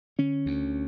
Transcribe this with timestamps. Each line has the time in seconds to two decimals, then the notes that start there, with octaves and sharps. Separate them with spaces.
0.19 D3 C#4
0.46 D2